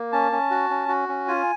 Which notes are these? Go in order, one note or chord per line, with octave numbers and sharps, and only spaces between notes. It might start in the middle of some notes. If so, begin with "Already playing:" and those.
Already playing: A#3
C#4 A5
C#4
F#4
C#4
F#4
C#4
F4 G#5